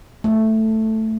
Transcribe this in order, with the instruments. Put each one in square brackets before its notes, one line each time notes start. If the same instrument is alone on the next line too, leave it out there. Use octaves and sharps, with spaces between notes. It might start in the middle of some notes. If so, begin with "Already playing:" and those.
[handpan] A3